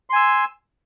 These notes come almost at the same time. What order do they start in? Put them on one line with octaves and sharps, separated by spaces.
C6 G#5 E6